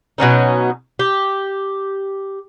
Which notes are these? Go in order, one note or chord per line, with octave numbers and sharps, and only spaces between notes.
B2 F#3 C#4 D#4
G4